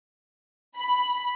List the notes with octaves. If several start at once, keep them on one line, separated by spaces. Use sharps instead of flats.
B5